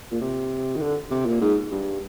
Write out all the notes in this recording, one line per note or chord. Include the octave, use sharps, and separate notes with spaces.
A#2
C3
D#3
D3
C3
A#2
G#2
G2